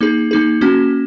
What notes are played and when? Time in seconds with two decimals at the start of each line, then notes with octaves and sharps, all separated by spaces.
0.01 A#3 D#4 G#4
0.31 A#3 D#4 G#4
0.61 A#3 C#4 F#4